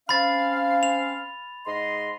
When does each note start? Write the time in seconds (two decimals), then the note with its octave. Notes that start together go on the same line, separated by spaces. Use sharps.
0.09 C4 C#4 F5 B5 A6
0.83 F7
1.67 G#2 D#5 C6